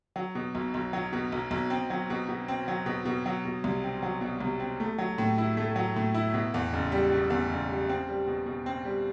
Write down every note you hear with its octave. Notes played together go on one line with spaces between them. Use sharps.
F#3
B2
B1
B1
F#3
B2
B1
B1
C4
F#3
B2
B2
C4
F#3
B2
B2
F#3
B2
C2
C4
F#3
B2
C2
C4
A3
F#3
A2
E4
A3
F#3
A2
E4
B2
E2
F#1
G3
B2
E2
F#1
G3
C4
G3
B2
B2
C4
G3